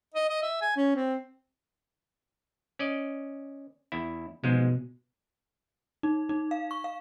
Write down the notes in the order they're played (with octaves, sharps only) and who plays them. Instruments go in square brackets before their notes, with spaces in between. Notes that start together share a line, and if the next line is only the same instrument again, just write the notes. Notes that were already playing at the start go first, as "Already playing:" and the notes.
[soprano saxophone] D#5
D#5
E5
G#5
C#4
C4
[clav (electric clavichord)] C#4 D5 D#5
E2 E4
[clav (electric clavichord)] G#2 F3 G#3 [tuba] B2
[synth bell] D#4
D#4
F5
C#6
F5